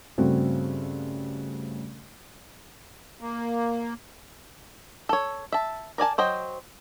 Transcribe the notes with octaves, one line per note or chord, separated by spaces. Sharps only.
G2 C#3 A3 C4 F#4
A#3
A4 C#5
E5 A5
A#4 D5 G#5 A5
F#3 C5 D#5 G5